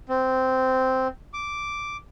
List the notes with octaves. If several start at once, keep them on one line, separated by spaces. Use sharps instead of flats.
C4
D6